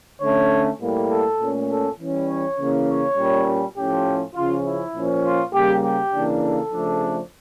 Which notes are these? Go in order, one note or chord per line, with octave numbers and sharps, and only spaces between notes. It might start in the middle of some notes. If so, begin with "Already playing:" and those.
D3 A3 C#4 C#5
A2 G3 A#3
A4
A#2 A3 C#4
A4
E3 G3 C#4
C#5
C#3 E3 A#3 C#4
C#5
A#2 G3 C#4
A2 F3 C#4 G4
C#3 F3 C#4 F4
E4
A#2 F3 C#4
F4
C#3 G3 A#3 G4
G4
C#3 E3 A#3 D4
A4
C#3 F3 A3 D4